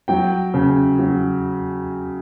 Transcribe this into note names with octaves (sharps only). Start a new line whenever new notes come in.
F#3 G5
C#3
F#3